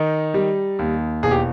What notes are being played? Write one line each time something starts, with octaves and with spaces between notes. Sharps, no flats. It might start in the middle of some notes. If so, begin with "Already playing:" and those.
Already playing: D#3 D#4
G3
D#2
E1 G#4
G4